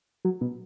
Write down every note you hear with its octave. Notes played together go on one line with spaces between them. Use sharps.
F#3
B2